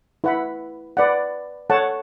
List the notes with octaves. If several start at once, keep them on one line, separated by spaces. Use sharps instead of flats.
E4 B4 F#5 B5
B4 D5 F#5
A4 C#5 F#5 A5